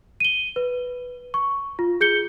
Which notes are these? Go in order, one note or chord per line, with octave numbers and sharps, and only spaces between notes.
D#7 G7
B4
C#6
F4
G#4 G6 C#7 G7